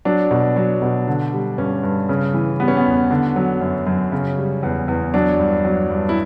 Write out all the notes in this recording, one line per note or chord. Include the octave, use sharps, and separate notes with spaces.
F#3 D4
B2
F#3
B2
D3
G3
G2 C#4
G2
C#3
E3
G3 B3
C#4
B3
E2
D3
F#3
F#2
F#2
C#3
G3
E2
E2
F#3 D4
G2
F#3
G2
E4